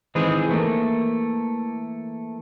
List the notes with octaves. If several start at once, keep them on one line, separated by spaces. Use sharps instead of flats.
D#3 E3 G#3 C4 G#4 C5
E3 A3 A#3